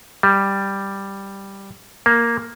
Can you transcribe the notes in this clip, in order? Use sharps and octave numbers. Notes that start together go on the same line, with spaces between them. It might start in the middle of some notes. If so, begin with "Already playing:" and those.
G3
A#3